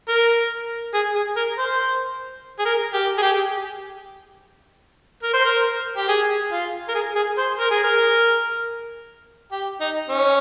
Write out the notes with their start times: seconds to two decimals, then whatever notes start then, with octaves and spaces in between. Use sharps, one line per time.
0.08 A#4
0.94 G#4
1.15 G#4
1.36 A#4
1.58 C5
2.59 G#4
2.65 A#4
2.94 G4
3.18 G#4
3.22 G4
5.23 A#4
5.33 C5
5.45 A#4
5.97 G4
6.08 G#4
6.51 F4
6.88 A#4
6.94 G#4
7.15 G#4
7.37 C5
7.59 A#4
7.71 G#4
7.84 A#4
9.52 G4
9.81 D#4
10.09 C#4